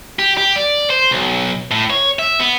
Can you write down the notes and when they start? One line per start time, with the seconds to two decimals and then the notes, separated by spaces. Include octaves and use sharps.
0.19 G4
0.37 G4
0.56 D5
0.90 C5
1.11 B1
1.71 A2
1.90 C#5
2.19 E5
2.40 B3